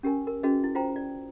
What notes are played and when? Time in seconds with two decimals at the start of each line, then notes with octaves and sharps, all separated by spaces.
0.03 C#4 G4 A#4 G#5
0.27 A#4
0.43 C#4 F#4 G#4 B4 D#5
0.64 E4
0.75 F4 C5 G5 A#5
0.96 D5